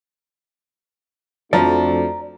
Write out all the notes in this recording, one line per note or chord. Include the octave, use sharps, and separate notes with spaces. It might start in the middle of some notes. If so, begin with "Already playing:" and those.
F2 F3 A3 D4 F#4 D5 A#5